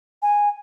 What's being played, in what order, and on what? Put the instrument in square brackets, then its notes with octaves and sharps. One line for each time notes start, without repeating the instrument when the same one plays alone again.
[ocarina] G#5